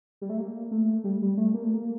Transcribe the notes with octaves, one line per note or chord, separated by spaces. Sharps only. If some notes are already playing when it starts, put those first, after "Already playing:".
G3
A3
A#3
A3
G3
G3
A3
A#3
A3
A#3